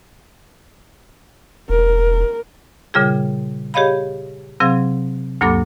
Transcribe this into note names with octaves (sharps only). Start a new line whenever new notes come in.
E1 A#4
A#2 C#3 G3 F4 G#4
G4 G#4 C#5 D#5 F5 B5
C3 F#3 C4 G#4 F5
D2 G2 F#3 A#3 A4 D6